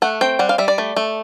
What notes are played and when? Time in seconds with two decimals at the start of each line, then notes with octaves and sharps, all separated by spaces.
0.02 A3 F#5
0.21 C4 G5
0.39 G3 F#5
0.49 F5
0.58 G3 E5
0.68 D5
0.78 A3
0.96 A3